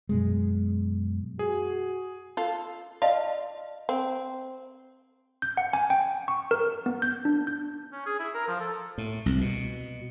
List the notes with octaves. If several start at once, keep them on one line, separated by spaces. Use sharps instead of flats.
F#2 B2 G#3
F#4 G#4
F4 A4
F4 D5 D#5 A5
C4
G6
F#5
G#5
G5
C#6
A#4
B3
G6
D4
G6
C#4
G#4
E4
A#4
F3
A4
A2
C2
B2